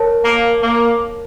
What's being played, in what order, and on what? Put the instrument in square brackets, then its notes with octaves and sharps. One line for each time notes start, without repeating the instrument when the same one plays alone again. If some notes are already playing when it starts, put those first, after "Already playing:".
Already playing: [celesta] A#4 C#5 A5
[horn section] A#3
A#3